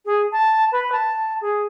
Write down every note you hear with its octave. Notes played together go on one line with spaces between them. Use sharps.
G#4
A5
B4
A5
G#4